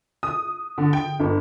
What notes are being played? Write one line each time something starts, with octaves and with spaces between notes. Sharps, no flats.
D#6
D3
G5
G1